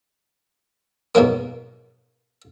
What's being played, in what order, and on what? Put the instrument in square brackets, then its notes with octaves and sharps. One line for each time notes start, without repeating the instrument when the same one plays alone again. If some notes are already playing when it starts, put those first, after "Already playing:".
[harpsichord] G#2 B2 F#3 A#3